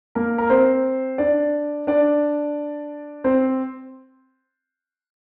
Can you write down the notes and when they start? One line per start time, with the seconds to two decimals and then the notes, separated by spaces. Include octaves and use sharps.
0.15 A#3 A#4
0.38 A#4
0.50 C4 C5
1.18 D4 D5
1.87 D4 D5
3.24 C4 C5